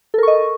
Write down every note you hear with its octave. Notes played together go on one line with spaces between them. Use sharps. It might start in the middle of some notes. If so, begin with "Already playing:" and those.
A4 A#4 D#5 C#6